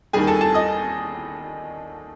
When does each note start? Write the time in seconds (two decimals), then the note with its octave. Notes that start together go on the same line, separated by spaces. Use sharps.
0.13 D#2 D#3 G3 G#4 G#5
0.27 A4 A5
0.41 A4 A5
0.54 D#5 D#6